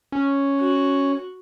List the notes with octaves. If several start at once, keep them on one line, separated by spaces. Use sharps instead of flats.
C#4
F#4